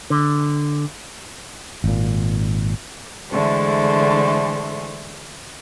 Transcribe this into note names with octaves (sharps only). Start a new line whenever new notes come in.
D3
G#1 A#2
D3 E3 G#3 A3 C5